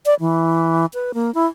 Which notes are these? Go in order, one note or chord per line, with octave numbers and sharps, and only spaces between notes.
D5
E3
B4
A#3
E4